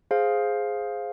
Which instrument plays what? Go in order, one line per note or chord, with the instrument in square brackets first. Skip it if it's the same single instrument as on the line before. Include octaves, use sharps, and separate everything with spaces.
[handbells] G#4 C5 F5